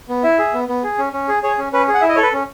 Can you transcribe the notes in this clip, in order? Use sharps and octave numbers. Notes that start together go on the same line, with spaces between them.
B3
E4 E5
G#4
B3
B3
G#4
C#4
C#4
G#4
G#4 C#5
C#4
C#4 B4
G#4
F#5
E4 E5
D#5
A4 C#5
B4
C#4